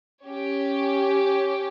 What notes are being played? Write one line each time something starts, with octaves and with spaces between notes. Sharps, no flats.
C#4 G4 C#5